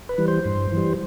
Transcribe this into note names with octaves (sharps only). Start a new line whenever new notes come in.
B4
E3 G3
C5
G2
E3 G3